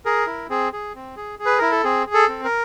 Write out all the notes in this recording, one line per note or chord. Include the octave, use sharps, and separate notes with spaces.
G#4 A#4
E4
C4 G#4
G#4
C4
G#4
G#4
B4
E4 A#4
A4
C4 G#4
G#4
A4
C4
A#4